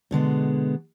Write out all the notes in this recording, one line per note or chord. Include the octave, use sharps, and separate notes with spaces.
B2 D3 G#3 B3